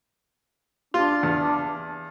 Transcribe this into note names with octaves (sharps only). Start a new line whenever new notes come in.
D4 F4
E2